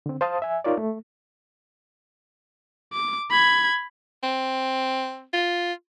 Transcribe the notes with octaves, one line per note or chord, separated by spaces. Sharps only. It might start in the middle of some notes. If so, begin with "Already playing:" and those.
D3 C4
C5 F5 A5 D#6
E5 G#5
D#4 F4 A#4 C#5 D5
A3
D6
B5 G#6
C4
F4